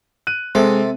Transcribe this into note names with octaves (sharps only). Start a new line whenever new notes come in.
F#6 D#7
C3 G#3 A4